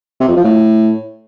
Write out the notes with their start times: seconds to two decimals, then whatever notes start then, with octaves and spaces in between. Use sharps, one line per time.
0.20 C3
0.28 F2
0.36 F3
0.44 A2